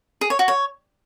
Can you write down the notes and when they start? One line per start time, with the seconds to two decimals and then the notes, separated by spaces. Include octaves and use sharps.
0.21 G#4
0.30 C#5
0.39 F#4
0.48 C#5